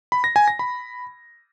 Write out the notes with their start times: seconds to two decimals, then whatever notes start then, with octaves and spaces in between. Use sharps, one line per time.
0.12 B5
0.24 A#6
0.36 G#5
0.48 A#6
0.59 B5